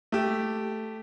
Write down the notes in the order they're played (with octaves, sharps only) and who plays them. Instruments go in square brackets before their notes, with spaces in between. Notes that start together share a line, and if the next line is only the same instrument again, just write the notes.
[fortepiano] A3 G4